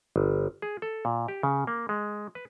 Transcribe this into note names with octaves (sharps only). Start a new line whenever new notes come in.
G1
G#4
A4
A#2
G4
C#3
A#3
G#3
B4